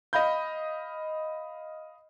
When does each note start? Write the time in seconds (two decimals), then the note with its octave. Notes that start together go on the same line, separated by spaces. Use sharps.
0.13 D#5 F5 B5 G6